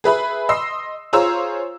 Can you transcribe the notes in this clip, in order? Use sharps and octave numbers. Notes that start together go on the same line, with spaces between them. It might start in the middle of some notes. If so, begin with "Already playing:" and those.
G#4 B4 E5 B5
D#5 C6 E6 C7
F4 G#4 C5 C#5 A#5 E6